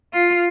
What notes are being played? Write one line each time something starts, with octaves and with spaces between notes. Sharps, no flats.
F4